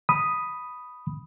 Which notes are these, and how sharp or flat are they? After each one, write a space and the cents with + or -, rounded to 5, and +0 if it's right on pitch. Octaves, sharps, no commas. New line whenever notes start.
B5 +0 D#6 +0